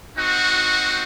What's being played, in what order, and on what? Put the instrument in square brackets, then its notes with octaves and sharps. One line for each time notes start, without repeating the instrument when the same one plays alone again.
[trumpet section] C4 D#4 F#4